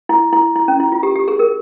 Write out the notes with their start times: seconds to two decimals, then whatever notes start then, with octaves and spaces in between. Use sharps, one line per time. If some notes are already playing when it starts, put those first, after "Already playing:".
0.09 E4
0.33 E4
0.56 E4
0.68 C#4
0.80 E4
0.92 F4
1.03 G4
1.15 G4
1.28 G#4
1.39 A#4